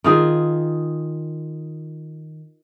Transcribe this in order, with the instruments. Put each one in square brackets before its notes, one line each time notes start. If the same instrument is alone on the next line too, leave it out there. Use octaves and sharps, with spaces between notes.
[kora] D#3 F4 G#4